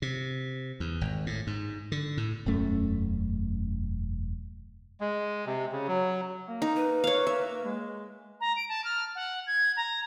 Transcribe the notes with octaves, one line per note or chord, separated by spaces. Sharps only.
C3
E2
G#1
A2
G#2
D3
A2
E1 F#2 A3 C#4
G#3
C3
C#3
F#3
A#3
D#4
B4
C#5 F5
E5
G#3
A#5
D7
A5
F6
F#5
G#6
A#5